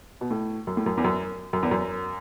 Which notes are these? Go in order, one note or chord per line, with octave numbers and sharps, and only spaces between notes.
B2
A2
F#2
A2
F#2
E2
F#2
F#2
E2
F#2